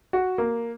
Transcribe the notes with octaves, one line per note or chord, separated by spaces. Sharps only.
F#4
A#3